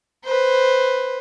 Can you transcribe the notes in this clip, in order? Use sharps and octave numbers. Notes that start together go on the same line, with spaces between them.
B4 C5